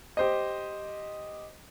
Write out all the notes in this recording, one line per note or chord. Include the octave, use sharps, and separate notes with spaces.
G4 C5 D#5